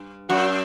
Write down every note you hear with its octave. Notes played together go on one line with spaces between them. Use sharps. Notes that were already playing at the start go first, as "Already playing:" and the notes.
Already playing: G2
F#2 F#4